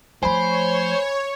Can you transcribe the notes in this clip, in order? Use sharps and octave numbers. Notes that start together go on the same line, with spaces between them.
F3 A3 C5 C#5 G#5 B5